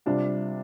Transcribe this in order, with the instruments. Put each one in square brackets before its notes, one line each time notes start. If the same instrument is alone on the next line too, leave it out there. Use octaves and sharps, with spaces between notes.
[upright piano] C3 G3 D4 F4